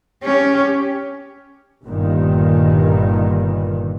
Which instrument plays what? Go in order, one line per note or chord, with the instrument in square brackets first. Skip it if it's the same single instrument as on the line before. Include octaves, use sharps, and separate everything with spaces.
[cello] C#4 G4
[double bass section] G1 G2 A#2 D#3